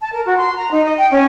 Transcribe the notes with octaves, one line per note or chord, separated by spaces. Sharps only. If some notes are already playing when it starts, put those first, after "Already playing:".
A5
A#4
F#4
C6
A#5
D#4
D#5
G5
C#4